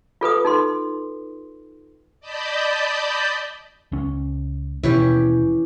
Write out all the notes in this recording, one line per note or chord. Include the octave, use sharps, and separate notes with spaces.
F4 A4 B4 D#6
D#4 A4 C6
D5 D#5 A5 B5 G6
C#2 C#4
D#2 B2 E3 C#4 G4